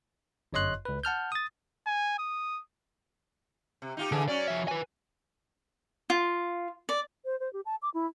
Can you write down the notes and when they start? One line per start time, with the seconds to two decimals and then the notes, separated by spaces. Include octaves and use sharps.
0.53 G1 F#2 C#5 D#5 C6 F#6
0.85 C#2 B4
1.03 F#5 A5 F6 G6
1.32 D#6 A6
1.86 G#5
2.19 D#6
3.82 C3
3.97 D#4 F4 G4
4.12 D3 E3 G#4
4.28 F#3 C#4 D5
4.47 F3 E5
4.68 B4 G#5
6.10 F4
6.89 D5
7.24 C5
7.40 C5
7.53 G4
7.66 A5
7.82 D6
7.94 E4